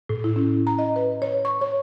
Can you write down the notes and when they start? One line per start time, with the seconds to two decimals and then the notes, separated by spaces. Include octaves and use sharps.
0.09 A2
0.24 E4
0.36 C#4
0.67 A#5
0.79 D#5
0.96 B4
1.22 C#5
1.45 C#6
1.61 C#5